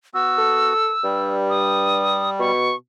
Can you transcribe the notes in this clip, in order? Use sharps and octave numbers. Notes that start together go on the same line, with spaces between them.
B3 F#4 E6
A4
G2 G3
D#6
B2 C#6